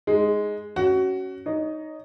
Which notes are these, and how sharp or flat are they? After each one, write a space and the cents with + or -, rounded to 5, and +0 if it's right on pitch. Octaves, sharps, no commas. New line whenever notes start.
G#3 +0 D#4 +0
C#4 +0 F#4 +20
D#4 +0 C#5 +35